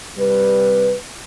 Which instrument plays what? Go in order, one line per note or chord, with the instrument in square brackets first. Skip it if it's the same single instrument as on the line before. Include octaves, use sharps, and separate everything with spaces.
[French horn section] C3 G3 B4